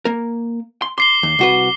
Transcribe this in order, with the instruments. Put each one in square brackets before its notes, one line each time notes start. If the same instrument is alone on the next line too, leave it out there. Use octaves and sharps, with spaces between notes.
[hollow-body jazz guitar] A#3 A#4
C6
[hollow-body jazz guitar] C6 [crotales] D6 C7 G7
[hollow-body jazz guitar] D#2
C2 F#4 B4